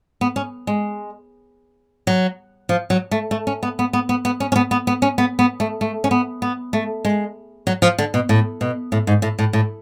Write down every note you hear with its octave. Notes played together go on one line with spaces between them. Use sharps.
B3
C#4
G#3
F#3
F3
F#3
A3
A3
C#4
B3
B3
B3
B3
B3
C#4
C#4
B3
B3
B3
C#4
B3
B3
A3
A3
C#4
B3
B3
A3
G#3
F#3
F3
D3
B2
A2
B2
A2
G#2
A2
A2
A2